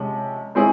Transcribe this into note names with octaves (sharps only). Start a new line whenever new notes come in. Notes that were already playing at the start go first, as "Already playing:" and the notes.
Already playing: C3 F3 G#3 C#4
G#3 C4 E4 G#4 C#5